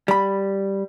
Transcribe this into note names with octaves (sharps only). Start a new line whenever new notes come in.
G3 B5